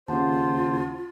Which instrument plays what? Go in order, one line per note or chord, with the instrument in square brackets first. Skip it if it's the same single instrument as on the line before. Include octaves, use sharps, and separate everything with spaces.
[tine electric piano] D#2 C#3 [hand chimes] C#4 F#5 A5 [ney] F4 [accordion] C5